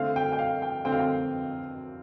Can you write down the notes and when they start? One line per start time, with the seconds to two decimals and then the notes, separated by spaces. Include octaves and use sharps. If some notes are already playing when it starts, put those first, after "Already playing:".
Already playing: D3 A3 C4 F5
0.16 G5
0.32 G5
0.39 F5
0.62 G5
0.85 D3 A3 C4 G5
0.92 F5
0.99 G5